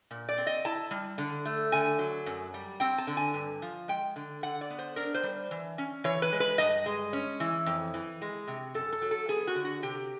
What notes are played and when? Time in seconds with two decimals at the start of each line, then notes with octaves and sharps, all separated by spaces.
0.11 A#2
0.29 D5
0.37 C4
0.47 D#5
0.65 E4 A5
0.91 G3
1.18 D3
1.45 A3
1.72 D3 G#5
1.99 F#3
2.26 F#2
2.54 G3
2.80 C4 G5
2.98 A5
3.07 D3
3.17 G#5
3.34 G2
3.62 F3
3.88 G#3 G5
4.16 D3
4.43 D3 F#5
4.61 D5
4.70 B3
4.79 C5
4.96 D4 A#4
5.14 C5
5.23 G3
5.51 E3
5.78 C#4
6.04 E3 C#5
6.22 B4
6.32 G#3
6.40 B4
6.58 G2 D#5
6.86 G#3
7.13 C#4
7.40 E3
7.66 F2
7.94 E3
8.22 G#3
8.48 C3
8.74 F#2 A4
8.93 A4
9.02 F#3
9.11 A4
9.28 B3 G#4
9.47 F#4
9.55 D3
9.65 F#4
9.82 C3 G4